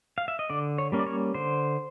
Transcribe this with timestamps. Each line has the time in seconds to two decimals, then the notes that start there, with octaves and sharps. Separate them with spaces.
0.18 F5
0.28 E5
0.39 D#5
0.50 D3 D5
0.78 C#5
0.92 G3 A#3 C#4
0.99 D5
1.07 C#5
1.34 D3 C5